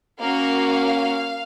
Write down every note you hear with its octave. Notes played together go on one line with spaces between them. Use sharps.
A#3 C#4 F#4 F5